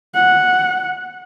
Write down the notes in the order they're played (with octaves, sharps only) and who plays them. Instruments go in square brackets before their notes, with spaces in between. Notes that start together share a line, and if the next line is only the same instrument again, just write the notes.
[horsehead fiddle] F#5